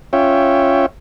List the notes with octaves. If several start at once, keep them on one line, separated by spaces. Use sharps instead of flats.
C#4 F4 C#5 E5 G5